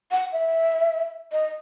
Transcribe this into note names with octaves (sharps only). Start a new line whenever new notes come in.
F#5
E5
D#5